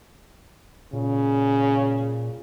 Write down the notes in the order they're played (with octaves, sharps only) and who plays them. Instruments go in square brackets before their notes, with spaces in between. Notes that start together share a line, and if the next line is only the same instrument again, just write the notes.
[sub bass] A#2 [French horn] C#3